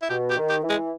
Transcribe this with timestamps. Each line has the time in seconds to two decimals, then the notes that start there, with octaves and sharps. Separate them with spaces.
0.02 E4
0.09 B2 G4
0.30 G4
0.37 D#3
0.49 G4
0.63 E3
0.69 G#3